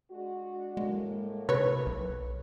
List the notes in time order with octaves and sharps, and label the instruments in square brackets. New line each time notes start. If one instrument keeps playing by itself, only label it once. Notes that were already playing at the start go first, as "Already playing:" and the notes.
[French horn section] G#3 D4 F#4
[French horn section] A2 A#3 [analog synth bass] G#3
[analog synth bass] C3 [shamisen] B4 C#5
[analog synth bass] B1